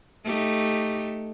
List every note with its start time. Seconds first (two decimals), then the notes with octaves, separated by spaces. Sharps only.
0.24 A3 D#4 G4